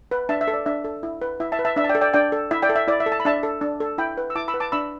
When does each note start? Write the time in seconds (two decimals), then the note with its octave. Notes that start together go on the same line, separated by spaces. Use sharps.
0.11 B4
0.29 D4 E5 A5
0.41 E5
0.48 A4
0.54 D5
0.66 D4 E5
0.84 A4
1.03 E4
1.22 B4
1.40 E4 E5
1.52 E5 A5
1.59 B4
1.65 E5 A5
1.76 D4 E5
1.84 A5
1.89 D5 G5
1.95 A4
2.01 D5 G5
2.14 D4 D5 G5
2.32 A4
2.51 E4 E5
2.62 D5 G5
2.70 A4
2.76 E5
2.88 E4 D5
3.00 E5
3.06 A4
3.12 A5
3.20 B5
3.25 D4 E5 A5
3.43 A4
3.61 D4
3.80 A4
3.98 E4 G5 B5
4.17 B4
4.30 E6
4.35 E4 A5 D6
4.48 B5 E6
4.54 B4
4.60 A5 D6
4.72 D4 B5 E6